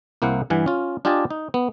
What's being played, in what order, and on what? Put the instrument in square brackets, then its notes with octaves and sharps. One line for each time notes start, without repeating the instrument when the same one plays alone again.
[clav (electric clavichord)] C2 A#3 E4 C5 F#5
G2 E3 F#5 G#5
C#4 F4
D4 F4 G4 D#5 G#5 A5
D#4
B3